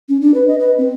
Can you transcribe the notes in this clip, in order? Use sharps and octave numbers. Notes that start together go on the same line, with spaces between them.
C#4
D4
B4
D#5
B4
C4